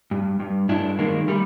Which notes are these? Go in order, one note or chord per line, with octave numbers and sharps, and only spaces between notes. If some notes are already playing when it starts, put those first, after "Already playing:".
G2
G2
G2 D4 E4
D#3 G#3 A#3
G3 A3